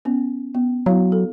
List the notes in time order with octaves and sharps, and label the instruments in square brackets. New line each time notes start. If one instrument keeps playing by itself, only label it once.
[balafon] B3 C#4
B3
[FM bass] F#3 [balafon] B3 E4 F5
[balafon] A4